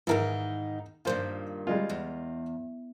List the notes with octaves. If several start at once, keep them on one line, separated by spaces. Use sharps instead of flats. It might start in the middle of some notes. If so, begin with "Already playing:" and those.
G#2 D#3 E3 D#4 E4 A#4
G2 A#2 D#3 F4 C5
G3 G#3 F4
E2